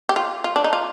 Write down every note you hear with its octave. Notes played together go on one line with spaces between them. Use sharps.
G4
F4
F4
D4
D#4
F4